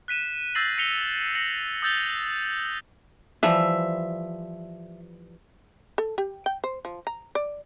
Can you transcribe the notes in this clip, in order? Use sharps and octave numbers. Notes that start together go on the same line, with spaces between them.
F#6 B6 D#7 E7
E6 G6 A6 A#6 C7 F#7
A#6 B6 C#7 F7 G7
A#6 C#7 F#7
D#6 E6 G6 A6 F7 G7
E3 F3 G3 E5
A4
G4
G5
C5
F3
A#5
D5